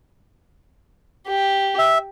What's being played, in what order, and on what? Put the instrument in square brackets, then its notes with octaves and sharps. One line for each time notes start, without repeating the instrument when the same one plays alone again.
[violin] G4
[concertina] E5